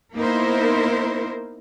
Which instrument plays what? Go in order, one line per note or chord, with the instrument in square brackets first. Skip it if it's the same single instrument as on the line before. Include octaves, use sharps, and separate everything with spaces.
[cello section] A#3 B3 D#4 E4 A#4 C5